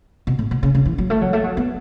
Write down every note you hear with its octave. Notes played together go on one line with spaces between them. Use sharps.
B2
A2
B2
C#3
C#3
E3
F#3
A3
F#3
A3
F#3
B3